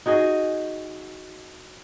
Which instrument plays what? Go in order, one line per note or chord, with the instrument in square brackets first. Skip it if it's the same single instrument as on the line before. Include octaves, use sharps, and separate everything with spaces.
[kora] D#4 F#4 G#4 D#5